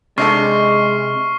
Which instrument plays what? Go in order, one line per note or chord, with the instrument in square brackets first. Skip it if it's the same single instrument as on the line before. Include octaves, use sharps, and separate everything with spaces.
[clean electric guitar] C3 [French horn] G#3 [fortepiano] D4 D#4 A4 [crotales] C#6 F6 C7